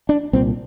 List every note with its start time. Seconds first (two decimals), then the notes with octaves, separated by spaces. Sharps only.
0.09 D4
0.33 C2 A#2 C4